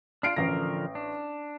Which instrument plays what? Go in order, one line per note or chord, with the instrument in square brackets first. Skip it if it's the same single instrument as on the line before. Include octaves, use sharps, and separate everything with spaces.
[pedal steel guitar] D4 F4 [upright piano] F6 C7 D7
[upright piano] A1 A#6 [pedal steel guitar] D3 F3 A#4
[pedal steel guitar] D4